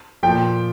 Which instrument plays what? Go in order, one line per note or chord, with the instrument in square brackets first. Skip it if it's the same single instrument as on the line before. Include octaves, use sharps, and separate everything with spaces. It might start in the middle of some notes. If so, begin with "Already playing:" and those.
[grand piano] A#2 F3 G5